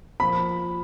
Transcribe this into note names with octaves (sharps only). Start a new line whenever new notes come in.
A#2 F3 B5